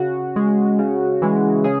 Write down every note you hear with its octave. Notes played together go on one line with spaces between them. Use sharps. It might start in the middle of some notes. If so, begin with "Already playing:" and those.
Already playing: C#3 F#4
G#3
C#3
E3 G#3
C#3 G#4